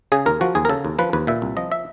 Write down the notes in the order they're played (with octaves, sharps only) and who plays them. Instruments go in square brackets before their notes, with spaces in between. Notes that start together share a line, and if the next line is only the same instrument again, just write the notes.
[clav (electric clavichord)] C#3 G#4
D#2 A#4
F3 F#4
D#2 G#4
A#4
C#3 A4
D#2
F3 B4
D#2 B4
A#2 E5
C2
F3 D#5
E5